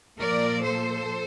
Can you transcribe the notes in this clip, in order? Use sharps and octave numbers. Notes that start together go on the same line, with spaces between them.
A#2 F3 A#3 A#4 D5
A4 C5